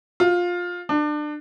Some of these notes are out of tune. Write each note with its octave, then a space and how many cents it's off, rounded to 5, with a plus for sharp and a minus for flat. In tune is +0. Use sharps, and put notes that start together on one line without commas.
F4 +15
D4 +30